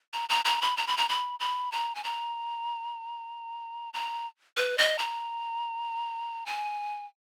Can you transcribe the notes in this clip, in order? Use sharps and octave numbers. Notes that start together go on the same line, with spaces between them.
A#5
A#5
A#5
B5
A#5
B5
A#5
B5
B5
A#5
G#5
A#5
A#5
B4
D#5
A#5
G#5